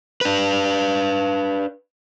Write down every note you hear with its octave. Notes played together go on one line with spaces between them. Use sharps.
D4 B4